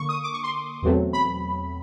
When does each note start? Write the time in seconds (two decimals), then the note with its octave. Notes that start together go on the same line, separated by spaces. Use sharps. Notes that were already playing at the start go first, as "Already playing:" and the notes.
Already playing: D3 A#3 C#6
0.09 D#6
0.23 D6
0.33 C#6
0.43 C6
0.82 E2 B2 F#3 A3 C4
1.13 B5